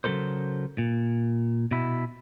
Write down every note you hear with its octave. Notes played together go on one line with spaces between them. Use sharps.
C#3 F#3 C#4 A4 A#4 C5
A#2
B2 E4